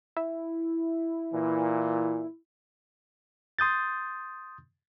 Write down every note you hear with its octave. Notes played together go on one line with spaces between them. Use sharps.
E4
A#2 E3
C6 D#6 G6 A6